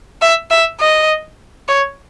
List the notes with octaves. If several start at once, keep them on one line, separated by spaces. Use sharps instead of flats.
E5
E5
D#5
C#5